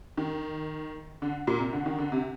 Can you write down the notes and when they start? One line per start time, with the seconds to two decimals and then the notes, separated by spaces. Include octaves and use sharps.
0.17 D#3
1.22 D3
1.47 A#2
1.60 C3
1.73 D3
1.86 D#3
1.98 D3
2.12 C3